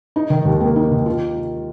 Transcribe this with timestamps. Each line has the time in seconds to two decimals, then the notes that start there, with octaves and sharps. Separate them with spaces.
0.16 D#4
0.30 D#3
0.45 D#2
0.61 A#3
0.76 D#4
0.92 D#3
1.06 F4